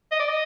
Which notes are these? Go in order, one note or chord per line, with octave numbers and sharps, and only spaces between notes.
D#5
D5
D#5